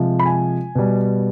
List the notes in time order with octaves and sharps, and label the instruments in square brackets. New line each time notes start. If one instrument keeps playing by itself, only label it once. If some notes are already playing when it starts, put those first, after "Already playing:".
Already playing: [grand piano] C3 F3 G#3
B5
G#5
B2 G3